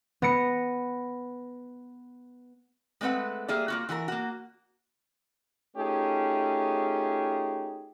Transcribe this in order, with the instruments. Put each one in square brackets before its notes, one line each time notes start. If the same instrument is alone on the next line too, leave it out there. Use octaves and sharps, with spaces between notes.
[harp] B3 A#6 C#7
[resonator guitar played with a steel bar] G#3 A3 C4 B4 F#5
G3 A#3 G#4 D5 E5
A#3 F4 F#4
E3 F#4 G#4 A#4
A#3 F#4
[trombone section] A3 C#4 D#4 F4 G4 G#4